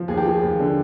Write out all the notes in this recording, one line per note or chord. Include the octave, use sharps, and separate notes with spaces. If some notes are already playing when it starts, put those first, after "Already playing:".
Already playing: F3
D#2 G#4
G4
F3 G#4
D#2
D3